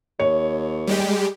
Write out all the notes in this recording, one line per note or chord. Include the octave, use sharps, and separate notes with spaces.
D#2 C#5
G3 G#3 G4